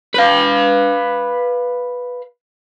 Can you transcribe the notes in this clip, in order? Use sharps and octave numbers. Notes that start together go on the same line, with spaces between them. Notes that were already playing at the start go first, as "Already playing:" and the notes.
B4 F5